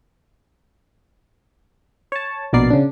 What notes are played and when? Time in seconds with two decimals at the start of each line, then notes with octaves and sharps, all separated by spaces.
2.12 C#5 A5
2.53 A#1 B2 B3 A#4 D5 C7
2.70 C#3 D4